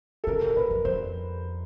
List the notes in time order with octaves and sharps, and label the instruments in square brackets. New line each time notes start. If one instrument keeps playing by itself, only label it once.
[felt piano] A4
[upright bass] C#3 [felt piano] A#4
[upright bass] C3
[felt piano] A#4
[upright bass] B2 [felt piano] B4
[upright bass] F2
[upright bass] F2 [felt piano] C5